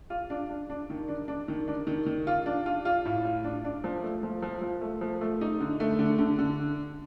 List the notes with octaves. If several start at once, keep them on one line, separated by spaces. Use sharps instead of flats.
F4
D4
D4
D4
D#3
D4
D4
D#3
D4
D#3
D#3
F4
D4
F4
F4
A2
F4
D4
D4
F3
A3
F3
F3
F3
A3
F3
A3
D#4
D3
A3
D3
D3
D3